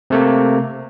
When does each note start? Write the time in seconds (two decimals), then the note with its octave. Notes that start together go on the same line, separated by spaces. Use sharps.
0.10 C3 A3 A#3